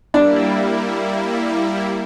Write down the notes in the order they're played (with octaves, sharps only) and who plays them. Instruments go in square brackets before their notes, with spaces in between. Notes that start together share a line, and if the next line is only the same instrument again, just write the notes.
[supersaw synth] G3 A#3 E4 [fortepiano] D4